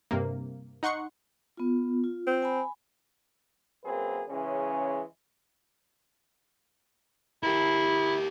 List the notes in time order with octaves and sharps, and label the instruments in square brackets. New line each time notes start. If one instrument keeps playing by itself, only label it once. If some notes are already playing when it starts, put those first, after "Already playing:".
[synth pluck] G2 C3 A#3
D#4 F#5 C6 C#6 C#7
[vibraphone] B3 F4
F4
[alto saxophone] C4
[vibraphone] G#5 B5
[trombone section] F#2 A#3 C4 G#4 B4
C#3 E3 G#3 C#4
[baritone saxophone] E4 [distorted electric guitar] G4 A#4